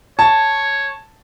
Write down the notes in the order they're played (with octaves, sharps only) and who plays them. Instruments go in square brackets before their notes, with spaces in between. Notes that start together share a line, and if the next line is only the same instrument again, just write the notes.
[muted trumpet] C#5 [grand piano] A5